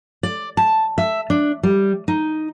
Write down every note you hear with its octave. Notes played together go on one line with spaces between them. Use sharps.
D5
A5
E5
D4
G3
D#4